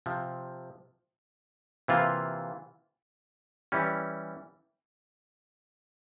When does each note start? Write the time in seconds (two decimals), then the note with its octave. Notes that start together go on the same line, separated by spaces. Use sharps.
0.06 C3 F3 C4
1.88 C3 E3 A#3 F4
3.72 E3 G3 C#4